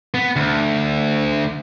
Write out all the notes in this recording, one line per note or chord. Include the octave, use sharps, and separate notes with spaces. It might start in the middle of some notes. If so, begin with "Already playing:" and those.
B3
D2